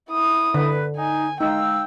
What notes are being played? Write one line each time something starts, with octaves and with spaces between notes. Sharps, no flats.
E4 D#6
D3 B4
D#4 G#5
G#3 D#4 F5 G5 E6